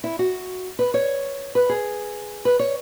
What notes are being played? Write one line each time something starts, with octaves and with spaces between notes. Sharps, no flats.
E4
F#4
B4
C#5
B4
G#4
B4
C#5